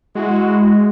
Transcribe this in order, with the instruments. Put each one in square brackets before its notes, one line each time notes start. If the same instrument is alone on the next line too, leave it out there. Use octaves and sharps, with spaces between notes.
[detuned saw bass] G#3 [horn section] E4 F#4